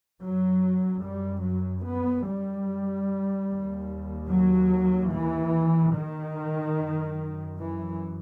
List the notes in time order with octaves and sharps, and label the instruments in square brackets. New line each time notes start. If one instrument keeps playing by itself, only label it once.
[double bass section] F#2 F#3
G3
F#3
B3
G3
D#2
F#3
E3
D#3
F#2
E3